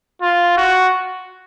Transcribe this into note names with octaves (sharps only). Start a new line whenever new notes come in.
F4
F#4